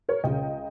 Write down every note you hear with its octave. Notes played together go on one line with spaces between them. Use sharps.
A#4 C#5
C#2 C#3 D#5 G5